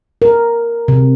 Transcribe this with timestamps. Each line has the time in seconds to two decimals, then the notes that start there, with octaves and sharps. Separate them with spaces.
0.22 A#4
0.88 C3